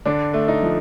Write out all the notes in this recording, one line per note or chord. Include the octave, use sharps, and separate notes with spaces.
D3 D4
A3
D#4
F3